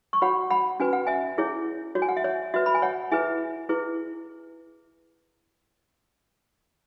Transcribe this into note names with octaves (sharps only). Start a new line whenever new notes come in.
C#6
F#4 C#5 F#5 B5
F#5 B5
C#4 F#4 B4 G#5
F#5
E5 G#5
E4 G#4 C#5
F#4 C#5
G#5
F#5
E5
C#5
F#4 B4 E5
B5
G#5
C#5 F#5
E4 G#4 B4 E5 G#5
E4 G#4 B4